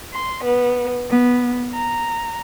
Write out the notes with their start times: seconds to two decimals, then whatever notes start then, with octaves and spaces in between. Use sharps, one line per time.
0.13 C6
0.44 B3
1.11 B3
1.74 A#5